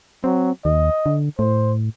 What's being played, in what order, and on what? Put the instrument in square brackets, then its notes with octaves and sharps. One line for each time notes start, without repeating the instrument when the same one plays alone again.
[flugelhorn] F#3 [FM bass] C4
[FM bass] D#2 [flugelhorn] D#5
[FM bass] D3
[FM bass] A2 [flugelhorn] C5